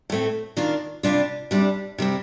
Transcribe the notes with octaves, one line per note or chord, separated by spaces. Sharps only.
A2 A3 C4
D#3 A#3 D4 F4
C3 G3 D4 F4
C3 G3 D4
C3 G3 C4